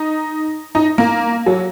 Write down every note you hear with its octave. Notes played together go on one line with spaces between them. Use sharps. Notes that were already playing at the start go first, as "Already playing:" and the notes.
Already playing: D#4
D#4
A#3
F#3